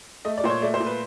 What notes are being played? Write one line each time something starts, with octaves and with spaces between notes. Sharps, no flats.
A3 D#5
D5
A#2 C5
C#5
A3 D5
C5
A#2
B4